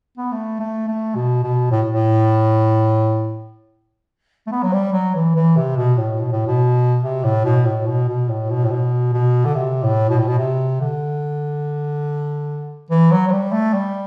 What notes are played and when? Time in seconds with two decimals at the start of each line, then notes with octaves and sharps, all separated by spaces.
0.18 B3
0.32 A3
0.60 A3
0.88 A3
1.15 B2
1.43 B2
1.71 A2
1.91 A2
4.47 A3
4.52 B3
4.63 F#3
4.73 G3
4.93 F#3
5.15 E3
5.36 E3
5.57 C3
5.77 B2
5.98 A2
6.19 B2
6.32 A2
6.47 B2
7.04 C3
7.24 A2
7.45 B2
7.66 A2
7.86 B2
8.08 B2
8.29 A2
8.50 B2
8.65 A2
8.71 B2
9.13 B2
9.45 D3
9.55 C3
9.83 A2
10.10 B2
10.19 A2
10.28 B2
10.39 C3
10.81 D3
12.90 E3
13.11 F#3
13.28 F#3
13.32 G3
13.52 A3
13.74 G3